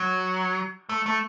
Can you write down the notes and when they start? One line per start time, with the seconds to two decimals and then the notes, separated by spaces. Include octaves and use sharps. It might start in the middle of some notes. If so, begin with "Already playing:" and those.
Already playing: F#3
0.89 A3
1.06 A3